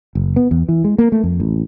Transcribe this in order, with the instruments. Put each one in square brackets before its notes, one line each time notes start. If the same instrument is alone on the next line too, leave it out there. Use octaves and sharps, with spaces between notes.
[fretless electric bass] F#1
B3
E2
E3
G#3
A#3
A3
F2
A1